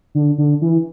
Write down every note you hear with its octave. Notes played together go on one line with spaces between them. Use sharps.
D3
D3
E3